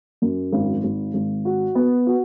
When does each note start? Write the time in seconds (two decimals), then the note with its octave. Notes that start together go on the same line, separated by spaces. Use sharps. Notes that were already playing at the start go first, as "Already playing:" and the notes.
0.22 F#2
0.53 G#1
0.84 G#1
1.14 G#1
1.45 F#4
1.75 B3
2.07 F#4